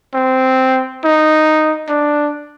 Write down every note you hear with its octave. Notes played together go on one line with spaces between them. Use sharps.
C4
D#4
D4